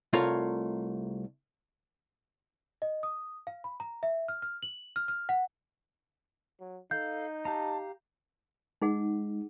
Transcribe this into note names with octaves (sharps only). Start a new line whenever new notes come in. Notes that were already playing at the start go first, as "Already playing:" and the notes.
C2 A3 F4 A#4 C#5 F5
D#5
D#6
F5
B5
A#5
E5
F6
F6
F#7
F6
F6
F#5
F#3
D#4 A4 F5 G6
G4 F5 A5 A#5
G#3 D#4 G#4 F#5